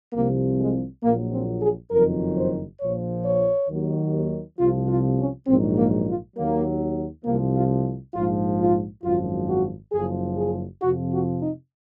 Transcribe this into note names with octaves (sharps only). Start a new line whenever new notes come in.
C2 C3 F3 A#3
G#3
A#1 A#2 F#3 A#3
C4
G#4
F#1 F2 D#3 F#3 A#4
C5
A#1 A#2 F3 C#5
C#5
D#2 D#3 F#3
C2 C3 F3 F4
F4
C#4
A#1 G#2 D#3 F#3 C4
A#3
F4
D#2 D#3 F#3 A#3
C2 C3 F3 A#3
F4
A#1 G#2 F3 F4
F4
G#1 F#2 F3 F4
F#4
F#1 F#2 F3 G#4
G#4
F2 C3 F3 F#4
F#4
D#4